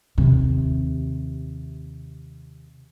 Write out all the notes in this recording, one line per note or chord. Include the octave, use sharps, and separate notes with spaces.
D#2 C3